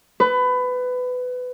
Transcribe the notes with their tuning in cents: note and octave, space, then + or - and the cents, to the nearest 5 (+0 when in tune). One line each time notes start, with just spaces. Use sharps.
B4 +20